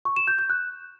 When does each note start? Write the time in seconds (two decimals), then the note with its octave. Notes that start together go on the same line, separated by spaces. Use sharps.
0.05 C#6
0.16 E7
0.27 G6
0.39 G6
0.50 F#6